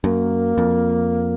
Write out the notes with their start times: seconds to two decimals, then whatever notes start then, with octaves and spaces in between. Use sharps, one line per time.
0.03 F#2 A#3
0.58 F2